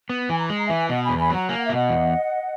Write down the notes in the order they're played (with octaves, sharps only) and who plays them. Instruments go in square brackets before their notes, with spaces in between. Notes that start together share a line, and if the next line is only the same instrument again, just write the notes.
[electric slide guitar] B3
[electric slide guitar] E3 [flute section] G#5
[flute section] A#5
[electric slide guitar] G#3 [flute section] G#5
[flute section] A#5
[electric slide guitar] E3 [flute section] E5 G#5
[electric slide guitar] B2 [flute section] D#5 F#5
[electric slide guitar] E2 [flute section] G#5 B5
[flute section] G#5 B5
[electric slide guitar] F#3 [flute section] F#5 A#5
[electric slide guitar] A#3 [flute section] G#5
[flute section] F#5
E5
[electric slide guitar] B2 [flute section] D#5 F#5
[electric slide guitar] E2